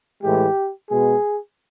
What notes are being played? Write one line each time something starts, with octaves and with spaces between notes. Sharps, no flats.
A2 E3 G#3 G4
B2 G#3 B3 G#4